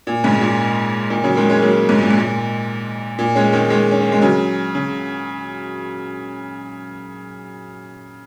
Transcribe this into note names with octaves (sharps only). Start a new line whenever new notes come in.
A#2
G#2 C#3
A#2
A#2 D#3
C#3 F#3
D#3 G#3
G#3 C#4
F#3 A#3
G#2 C#3
A#2
G#2
A#2
A#2
G#3 C#4
D#3 G#3
D#3 G#3
C#4
A#3
G#3
C#3 F#3
C#3